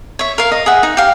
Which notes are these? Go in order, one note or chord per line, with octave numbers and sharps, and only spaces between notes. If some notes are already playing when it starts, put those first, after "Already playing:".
C#5 E5
A#4 F5
D#5
G#4 E5 F#5
D#4
G4 F5